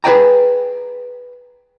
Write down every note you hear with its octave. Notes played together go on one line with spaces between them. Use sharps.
G#4 B4 C5 D5 G5 A#5